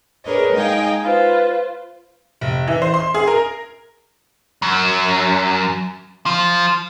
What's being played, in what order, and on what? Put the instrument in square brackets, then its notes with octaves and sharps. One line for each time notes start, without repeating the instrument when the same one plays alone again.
[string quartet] D4 G#4 A#4 B4 C#5 D#5
G#3 D#4 D#5 F5 G5 G#5
F4 B4 C5
[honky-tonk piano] F1
E3
C5
C6
G#4
A#4
[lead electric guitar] F#2
F3